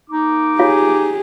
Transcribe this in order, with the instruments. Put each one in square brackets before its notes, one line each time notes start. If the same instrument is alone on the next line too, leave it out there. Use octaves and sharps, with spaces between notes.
[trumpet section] A#3 D6 [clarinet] D#4
[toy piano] F4 C#5 F5 [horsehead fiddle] G4 G#4